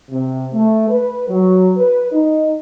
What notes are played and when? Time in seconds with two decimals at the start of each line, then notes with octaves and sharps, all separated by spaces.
0.11 C3
0.54 A3
0.90 B4
1.29 F#3
1.77 B4
2.12 D#4